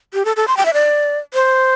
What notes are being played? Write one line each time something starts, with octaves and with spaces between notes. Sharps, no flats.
G4
A4
A4
C6
G5
E5
D5
C5